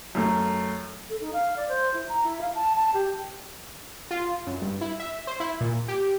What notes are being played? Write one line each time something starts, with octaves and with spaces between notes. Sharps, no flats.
F#2 A3
A4
D#4
F5
D5
C5
E4
A#5
E4
F5
A5
A5
G4
F4
F#2
G2
E4
E5
C5
E4
A#2
G4